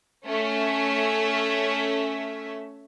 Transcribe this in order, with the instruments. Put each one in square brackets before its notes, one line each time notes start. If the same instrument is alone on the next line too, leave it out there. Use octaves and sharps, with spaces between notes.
[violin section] A3 C#4 E5